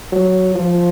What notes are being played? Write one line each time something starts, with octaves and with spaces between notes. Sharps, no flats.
F#3
F3